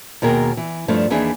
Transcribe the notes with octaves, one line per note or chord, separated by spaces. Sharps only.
D#2 B2 G#4 A#4 G5
E3
G2 F3 A3 D4
D#2 E3 D4 G#4 E5